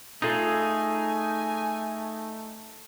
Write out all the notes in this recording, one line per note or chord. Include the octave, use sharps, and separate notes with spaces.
A3 D#4 F4 G#4 A4 G#5